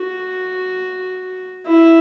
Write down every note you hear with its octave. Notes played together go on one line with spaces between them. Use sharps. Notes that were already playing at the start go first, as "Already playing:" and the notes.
Already playing: F#4
E4